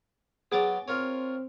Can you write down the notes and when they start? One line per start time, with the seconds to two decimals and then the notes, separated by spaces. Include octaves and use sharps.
0.52 F#3 B3 G#4 D6 A6
0.88 C4 F4 A#4 C#5